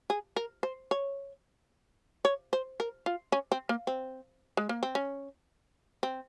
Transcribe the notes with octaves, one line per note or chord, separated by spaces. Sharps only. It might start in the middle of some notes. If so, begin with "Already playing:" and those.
G#4
A#4
C5
C#5
C#5
C5
A#4
F4
C#4
C4
A#3
C4
G#3
A#3
C4
C#4
C4